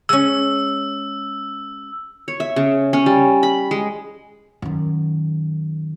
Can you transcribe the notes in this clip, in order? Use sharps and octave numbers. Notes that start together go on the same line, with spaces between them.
G#3 C#4 E6
C#5
E5
C#3
C#4
G3
B5
G#3
F#2 D#3